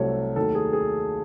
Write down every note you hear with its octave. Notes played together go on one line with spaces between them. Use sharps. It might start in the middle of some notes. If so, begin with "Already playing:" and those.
Already playing: C2 C3 F#3 A3 A4 C#5
D#2 D#3 F#3 A3 A4
G#4
G#4